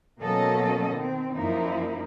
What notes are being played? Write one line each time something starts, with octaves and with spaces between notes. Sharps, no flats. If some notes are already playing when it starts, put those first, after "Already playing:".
B2 F#3 A#3 C#4 A4 D#5
D#3 C4
F#2 F3 A#3 D#4 E4